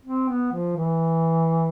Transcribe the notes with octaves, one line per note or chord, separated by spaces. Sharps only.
C4
B3
F3
E3